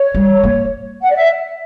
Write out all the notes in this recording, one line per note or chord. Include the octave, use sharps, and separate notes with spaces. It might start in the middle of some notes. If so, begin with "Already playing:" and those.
Already playing: C#5
G3
A#3
F#5
D5
E5